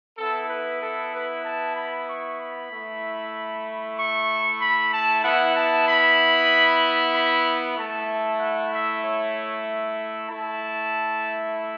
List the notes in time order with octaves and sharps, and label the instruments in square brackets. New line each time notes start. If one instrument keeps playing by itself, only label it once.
[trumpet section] B3 E4 A4
B4
A4
B4
A5
B5
C#6
B5
A3 E4
C#6
B5
A5
B3 E4 F#5
A5
B5
B5
A3 E4 A5
F#5
E5
C#5
A3 E4 A5